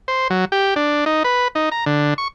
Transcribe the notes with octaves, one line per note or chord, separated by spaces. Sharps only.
C5
F#3
G4
D4
D#4
B4
D#4
A#5
D3
C#6